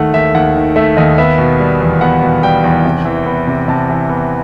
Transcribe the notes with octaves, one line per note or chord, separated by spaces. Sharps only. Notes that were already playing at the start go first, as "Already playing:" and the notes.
Already playing: D#2 D#3 A3 F#5
D#2 E5
D#2 F#5
D#3
A3 E5
D#2 D#5
B3 E5
B2
G3
E2
B3 F#5
B2
G3 G5
E2
C3
E3
B3
C3
C3 A5
E3
B3